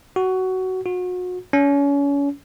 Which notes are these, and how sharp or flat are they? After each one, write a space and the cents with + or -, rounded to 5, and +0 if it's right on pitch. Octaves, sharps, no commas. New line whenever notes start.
F#4 +15
F#4 -35
C#4 +35